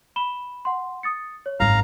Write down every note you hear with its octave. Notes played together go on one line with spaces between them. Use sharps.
B5 E7 G7
F#5 C6
D#6 A6 C#7
C#5
G#1 F#2 F5 A#5